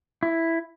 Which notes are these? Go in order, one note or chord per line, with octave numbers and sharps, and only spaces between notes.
E4